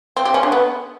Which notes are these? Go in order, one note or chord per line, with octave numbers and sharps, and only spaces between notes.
C4
G4
C#4
D3
B3